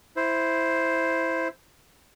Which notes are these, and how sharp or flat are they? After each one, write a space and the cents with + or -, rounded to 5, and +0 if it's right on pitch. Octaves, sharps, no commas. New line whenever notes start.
E4 +0 C5 +0